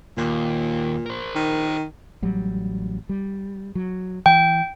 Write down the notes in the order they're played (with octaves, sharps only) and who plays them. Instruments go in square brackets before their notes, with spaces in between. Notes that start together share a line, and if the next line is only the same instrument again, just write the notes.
[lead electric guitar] D#2 [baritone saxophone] A#2
[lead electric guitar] A#4 C5
[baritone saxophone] D#3
[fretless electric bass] A1 F#3 G3
G3
F#3
[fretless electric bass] E3 [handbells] G5